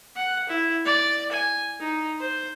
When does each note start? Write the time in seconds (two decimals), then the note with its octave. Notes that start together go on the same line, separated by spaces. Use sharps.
0.16 F#5
0.49 E4
0.85 D5
1.32 G#5
1.80 D#4
2.20 C5